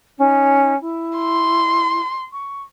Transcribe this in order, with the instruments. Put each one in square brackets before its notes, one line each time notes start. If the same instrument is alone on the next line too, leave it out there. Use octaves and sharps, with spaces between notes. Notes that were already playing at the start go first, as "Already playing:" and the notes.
[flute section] C#4 D#4
E4
[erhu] C6
[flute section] C#6